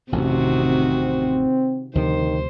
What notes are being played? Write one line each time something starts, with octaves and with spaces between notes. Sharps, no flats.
A1 F2 C3 D#3 F#4
C4
D2 C3 D#3 F3 C5